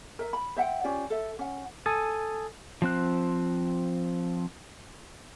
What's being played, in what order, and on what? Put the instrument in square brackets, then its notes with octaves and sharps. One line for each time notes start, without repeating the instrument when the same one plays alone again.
[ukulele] A#4 E5
B5
C5 E5 F#5 G5
C#4 F4 G4 D5
A4 E5
C#4 F#5
[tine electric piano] A4 G#5 D#6 A6
[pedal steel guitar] F3 C4 F#6